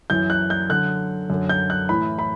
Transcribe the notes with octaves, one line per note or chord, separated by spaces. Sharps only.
F#2 E3 G6
F#6
G6
F#2 D3 F#6
F#2 D3
G6
F#6
A2 E3 B5
B5